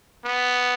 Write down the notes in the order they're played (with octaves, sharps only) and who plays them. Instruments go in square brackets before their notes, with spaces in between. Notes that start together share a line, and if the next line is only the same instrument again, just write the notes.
[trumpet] B3